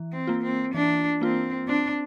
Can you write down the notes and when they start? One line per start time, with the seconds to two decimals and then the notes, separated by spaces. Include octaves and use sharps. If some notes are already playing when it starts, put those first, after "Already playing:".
Already playing: E3
0.12 C4
0.27 A#3 F4
0.43 C4
0.74 E3 D4
1.21 A#3 C4 F4
1.68 C4 D4